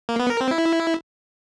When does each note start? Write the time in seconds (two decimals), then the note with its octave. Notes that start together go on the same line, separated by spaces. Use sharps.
0.09 A#3
0.19 B3
0.30 A#4
0.41 C4
0.51 E4